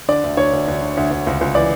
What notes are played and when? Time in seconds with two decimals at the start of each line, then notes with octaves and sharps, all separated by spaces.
0.08 D3 D5
0.24 D2
0.37 D2 C#5
0.53 D2
0.68 D2
0.82 D3
0.97 D2
1.11 D2
1.27 C#2
1.41 C#2
1.55 E3 D5